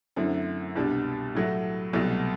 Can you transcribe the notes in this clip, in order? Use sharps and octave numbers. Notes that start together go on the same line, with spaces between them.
F#2 D3 A3 C4 E4
C2 B2 G3 D4
A2 F#3 A3 E4
C2 B2 F#3 A3